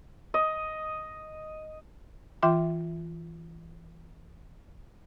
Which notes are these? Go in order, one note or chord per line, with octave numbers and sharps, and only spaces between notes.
D#5
E3 F4 E5 G5 C6 D6